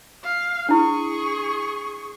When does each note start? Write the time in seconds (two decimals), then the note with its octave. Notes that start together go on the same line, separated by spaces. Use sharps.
0.24 F5
0.69 D4 E4 G#4 C#6